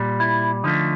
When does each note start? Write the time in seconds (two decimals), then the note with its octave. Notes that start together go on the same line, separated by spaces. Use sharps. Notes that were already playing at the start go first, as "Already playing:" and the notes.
Already playing: A#2 G3
0.20 E4
0.64 D3 F3 A3 D#4